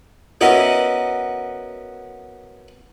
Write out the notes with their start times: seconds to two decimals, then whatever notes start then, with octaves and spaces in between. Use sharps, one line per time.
0.41 B3 C#4 E4 F#4 A#4 D#5